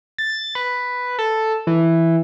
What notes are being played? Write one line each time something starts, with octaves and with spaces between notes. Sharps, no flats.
A6
B4
A4
E3